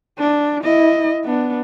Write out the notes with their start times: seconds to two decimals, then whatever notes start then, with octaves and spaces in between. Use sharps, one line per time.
0.18 D4
0.64 E4 D#5
1.25 B3 D4